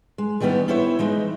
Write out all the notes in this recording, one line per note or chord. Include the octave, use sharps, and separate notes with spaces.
G#3
D#3 E3 G3 B3 C#4
B3 E4 C5 C#5 E5
E3 G#3 D#4